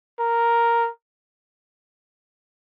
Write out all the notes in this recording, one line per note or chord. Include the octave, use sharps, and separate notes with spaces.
A#4